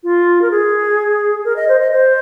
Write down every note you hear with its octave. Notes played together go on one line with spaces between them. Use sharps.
F4
A#4
G#4
A#4
D#5
C5
D#5
C5